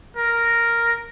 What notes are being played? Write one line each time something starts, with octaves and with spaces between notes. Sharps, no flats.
A#4